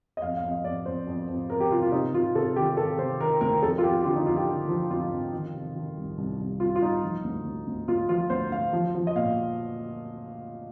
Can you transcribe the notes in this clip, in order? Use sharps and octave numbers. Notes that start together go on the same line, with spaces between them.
D#5
F2 F5
F5
F2
D#5
F2 D5
F2 C5
F2
F2
F2 A#4
G4
C3 F4
F4
C3 D#4
C3 F4
C3 A4
D#3 G4
C3 A4
C3 C5
D#3 A#4
D2 A#4
F2 A4
F4
F2 G4
G4
D3 F4
D#4
F2 F4
G4
D3
F3
F2 F4
F2
D#3
C3
D#3
C2
C2
C2
C2 F4
F4
C2 D#4
F3
D2
D2
D2
D2 F4
F3 F4
D2 C5
D2 F5
F3
F3
D#5
A#2 F5